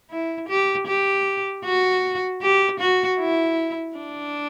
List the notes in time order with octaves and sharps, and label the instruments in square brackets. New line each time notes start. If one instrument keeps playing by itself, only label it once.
[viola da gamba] E4
G4
G4
F#4
G4
F#4
E4
D4